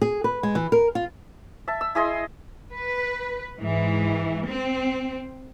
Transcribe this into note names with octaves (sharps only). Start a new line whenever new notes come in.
G#4
B4
G#3
E3
A#4
F4
E5 A5
E6
E4 G#4 D#5 C6
B4
G#2 E3
C4